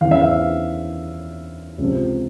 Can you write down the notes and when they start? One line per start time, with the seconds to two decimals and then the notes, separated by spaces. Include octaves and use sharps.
0.01 E2 C#3 E3 F5
0.11 E5
0.21 F5
1.78 C#2 C3 F3